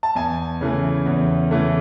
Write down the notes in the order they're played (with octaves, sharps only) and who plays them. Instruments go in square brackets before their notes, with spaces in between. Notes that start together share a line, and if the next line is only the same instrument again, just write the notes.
[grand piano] A5
E2 G#5
C#3 E3 A3
E2
C#3 E3 A3